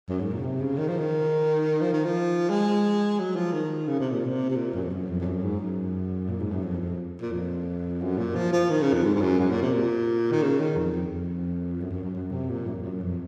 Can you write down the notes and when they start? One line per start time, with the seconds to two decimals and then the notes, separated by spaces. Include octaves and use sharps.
0.09 F#2
0.20 G#2
0.32 A#2
0.39 C#3
0.43 C3
0.60 C#3
0.78 D#3
0.88 F3
0.98 D#3
1.81 F3
1.93 D#3
2.05 F3
2.50 G#3
3.19 F#3
3.36 F3
3.53 D#3
3.87 C#3
4.00 C3
4.12 A#2
4.24 C3
4.50 C3
4.56 A#2
4.74 F#2
4.82 F2
4.91 F#2
5.08 F2
5.21 F2
5.25 F#2
5.43 G#2
5.60 F#2
6.29 A#2
6.40 G#2
6.52 F#2
6.63 F2
6.80 F2
7.21 A#2
7.32 F2
8.01 F#2
8.18 A#2
8.35 F3
8.53 F3
8.70 D#3
8.82 C#3
8.94 F2
9.04 G#2
9.15 G#2
9.21 F#2
9.39 F#2
9.51 A#2
9.62 C3
9.73 A#2
10.32 D#3
10.42 C#3
10.60 D#3
10.77 F2
10.94 F2
11.10 F2
11.80 F#2
11.91 F#2
12.03 F#2
12.15 F#2
12.31 C3
12.49 A#2
12.67 F#2
12.75 F2
12.83 F#2
13.01 F2